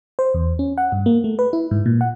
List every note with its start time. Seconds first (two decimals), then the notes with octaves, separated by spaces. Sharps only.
0.19 C5
0.34 E2
0.59 C#4
0.78 F#5
0.92 G2
1.06 A#3
1.24 A3
1.39 B4
1.53 E4
1.71 G#2
1.86 A#2
2.01 F#5